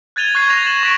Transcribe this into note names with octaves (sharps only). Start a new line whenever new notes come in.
F#6 G#6 A6 D#7 F7 G7
C#6 F#6 G#6 C7
A6 A#6 F7
G#6 A6 E7 F#7
C#6 B6 D7